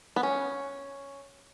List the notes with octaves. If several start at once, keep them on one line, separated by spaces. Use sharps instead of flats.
B3
C#4